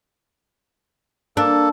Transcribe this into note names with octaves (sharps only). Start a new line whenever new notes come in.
A#3 D4 A4